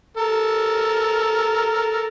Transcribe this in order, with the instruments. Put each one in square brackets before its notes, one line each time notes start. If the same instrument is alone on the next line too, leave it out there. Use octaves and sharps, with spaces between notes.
[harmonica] A4 A#4